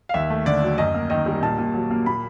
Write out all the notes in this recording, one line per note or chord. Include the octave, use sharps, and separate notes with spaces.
F5
D#2 E5
A3
D3 D5
F#3
F#2 D#5
A#3
D#3 D#5
G3
A#2 A5
A#2
F#3
A#3
A#2 B5